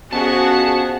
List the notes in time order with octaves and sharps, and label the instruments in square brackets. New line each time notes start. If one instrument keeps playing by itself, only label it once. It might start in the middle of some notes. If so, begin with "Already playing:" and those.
[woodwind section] F2 B3 [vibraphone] C#4 [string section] F#4 G#4 F#5 [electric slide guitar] A5